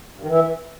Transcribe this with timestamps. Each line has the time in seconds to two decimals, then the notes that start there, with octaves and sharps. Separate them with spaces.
0.18 G2
0.23 D#3
0.28 E3